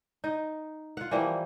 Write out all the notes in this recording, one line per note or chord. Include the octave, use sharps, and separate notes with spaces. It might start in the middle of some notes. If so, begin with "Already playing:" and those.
D#4
F4 F#5
E3 F3 G3 A#3